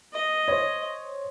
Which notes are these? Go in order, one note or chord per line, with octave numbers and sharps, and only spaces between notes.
D#5
C5 C#5